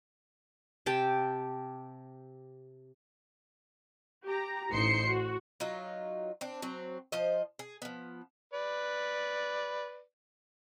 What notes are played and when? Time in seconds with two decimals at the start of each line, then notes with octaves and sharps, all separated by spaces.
0.86 C3 G4 G5 A5
4.27 G4 A#5
4.71 A1 D#4 C5 C6 C7 C#7
5.06 F#4
5.60 F#3 D#4 F4
6.41 C4 D4
6.62 F#3 C4
7.12 F3 C5 D#5
7.59 G#4
7.82 F3 B3
8.54 B4 D5